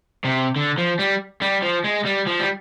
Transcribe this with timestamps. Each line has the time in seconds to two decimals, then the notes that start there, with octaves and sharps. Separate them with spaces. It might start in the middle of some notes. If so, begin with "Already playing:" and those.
0.25 C3
0.56 D3
0.78 F3
0.99 G3
1.42 G3
1.63 F3
1.85 G#3
2.06 G3
2.27 F3
2.40 G3